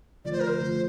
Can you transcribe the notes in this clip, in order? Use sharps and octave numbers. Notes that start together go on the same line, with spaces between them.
D3 F3 A3 D5
C5
A#4
C5
D3 F3 A3